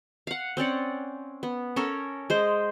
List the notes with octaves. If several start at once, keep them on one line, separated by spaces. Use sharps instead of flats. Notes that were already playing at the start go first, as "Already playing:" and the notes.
F5 F#5
C4 C#4 D5 F#5
B3
C#4 A4 A#4
G#3 C5